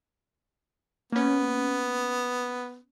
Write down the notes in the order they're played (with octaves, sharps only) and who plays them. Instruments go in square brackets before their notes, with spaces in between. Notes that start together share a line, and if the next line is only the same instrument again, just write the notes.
[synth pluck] A#3 C#4 [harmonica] B3